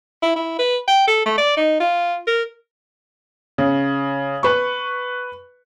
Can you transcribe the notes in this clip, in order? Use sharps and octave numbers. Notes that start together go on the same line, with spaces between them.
E4
E4
B4
G5
A4
A3
D5
D#4
F4
A#4
C#3
B4 C#6